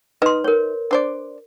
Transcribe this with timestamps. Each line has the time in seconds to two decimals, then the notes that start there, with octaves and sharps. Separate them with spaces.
0.22 D#4 B4 D#5 C6
0.44 A#4 C#5
0.91 D4 C5 D5